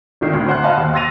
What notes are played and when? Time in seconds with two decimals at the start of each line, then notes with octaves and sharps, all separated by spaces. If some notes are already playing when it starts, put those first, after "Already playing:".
0.21 G#1 D3 D#3 C7
0.33 D2 A2
0.48 C5 F#5 C6 F#6
0.63 D#5 F5 F#5 A5 B5 C6
0.77 D#2
0.93 C6 E6 A6 A#6 D#7 F7